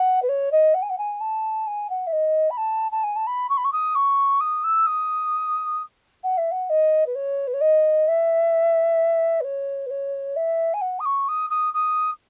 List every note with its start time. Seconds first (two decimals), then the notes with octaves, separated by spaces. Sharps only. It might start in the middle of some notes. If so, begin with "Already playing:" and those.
Already playing: F#5
0.23 B4
0.29 C#5
0.52 D#5
0.74 F#5
0.82 G#5
0.90 F#5
0.98 G#5
1.21 A5
1.67 G#5
1.90 F#5
2.07 E5
2.13 D#5
2.50 B5
2.57 A5
2.92 A5
3.04 G#5
3.16 A5
3.27 B5
3.50 C#6
3.57 B5
3.65 C#6
3.73 D#6
3.95 C#6
4.41 D#6
4.64 E6
4.87 D#6
6.24 F#5
6.38 E5
6.52 F#5
6.70 D#5
7.07 B4
7.15 C#5
7.47 B4
7.54 C#5
7.61 D#5
8.08 E5
9.41 B4
9.44 C#5
9.86 B4
9.90 C#5
10.36 E5
10.74 G#5
10.81 F#5
11.00 D#6
11.06 C#6
11.28 D#6
11.50 D#6
11.74 D#6